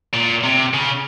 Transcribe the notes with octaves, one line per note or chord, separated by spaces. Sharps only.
A#2
C3
C#3